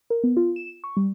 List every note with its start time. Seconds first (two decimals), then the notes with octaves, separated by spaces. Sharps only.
0.10 A#4
0.24 B3
0.37 F4
0.56 E7
0.84 C#6
0.97 G3